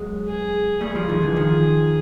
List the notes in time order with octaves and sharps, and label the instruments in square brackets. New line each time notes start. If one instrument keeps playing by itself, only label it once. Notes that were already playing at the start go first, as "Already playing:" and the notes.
Already playing: [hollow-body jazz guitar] F#3 G#3
[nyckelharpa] G#4
[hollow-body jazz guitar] G3 A3 [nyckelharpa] G#4
[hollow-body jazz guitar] F3 G3
D#3 F3
D3 E3
D#3 F3